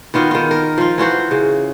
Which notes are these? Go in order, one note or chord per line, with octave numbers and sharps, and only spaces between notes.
D#3 B3 F4 F#4
D#3 F4
A#4
F3 F4
E3 F4 F#4 C5
C#3